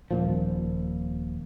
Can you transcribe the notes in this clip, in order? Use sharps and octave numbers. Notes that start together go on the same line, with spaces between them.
D#1 A#2 F3